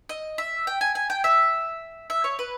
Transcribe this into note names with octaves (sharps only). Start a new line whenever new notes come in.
D#5
E5
G5
G#5
G#5
G5
E5
E5
C#5
B4